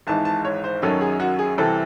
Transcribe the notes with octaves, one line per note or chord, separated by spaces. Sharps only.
G#1 G#2 E3 G#3 A5
A5
C#5
C5
F#2 D#3 F#3 C#4 A4
G#4
F#4
G#4
C2 C3 E3 C4 A4